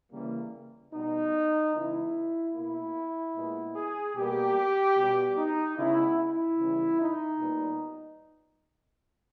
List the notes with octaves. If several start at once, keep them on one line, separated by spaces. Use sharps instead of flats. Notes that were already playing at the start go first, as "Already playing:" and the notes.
C#3 E3 G3 A#3
B2 G3 B3 D#4
C#3 E3 G#3 B3 E4
B2 A#3 E4
A#2 G#3 B3
G#4
B2 G3 A#3 G4
B2 G3 B3
D#4
C#3 G#3 B3 E4
E4
C#3 E3 G3 B3
D#4
A#2 G3 B3